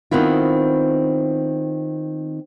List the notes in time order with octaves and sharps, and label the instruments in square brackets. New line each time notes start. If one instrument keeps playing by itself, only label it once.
[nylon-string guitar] D#3 B3 C4 E4 F4